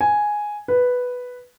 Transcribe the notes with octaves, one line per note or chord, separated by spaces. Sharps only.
G#5
B4